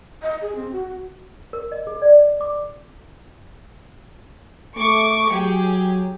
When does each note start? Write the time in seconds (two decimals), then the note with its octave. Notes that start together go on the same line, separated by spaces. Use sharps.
0.22 D#5
0.42 G#4
0.55 C4
0.72 F#4
1.53 A#4
1.72 D#5
1.87 G#4
2.02 D5
2.41 D6
4.76 A3 C#6 D6
5.30 F#3 G4 G#4